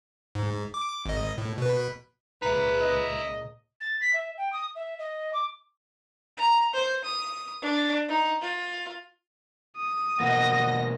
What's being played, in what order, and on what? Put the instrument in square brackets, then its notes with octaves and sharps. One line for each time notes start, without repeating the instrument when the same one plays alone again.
[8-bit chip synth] G#2
D6
G#1 D#5
A2
B2 B4
[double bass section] C#2 A#2 [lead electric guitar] D#4 E5 [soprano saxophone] B4
[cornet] D#5
[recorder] A6
B6
E5
G5
D#6
E5
D#5
D6
[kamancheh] A#5
C5
D#6
D4
D#4
F4
[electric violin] D#6
[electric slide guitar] B2 E3 A#3 [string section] D#5 A#6 [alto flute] F#5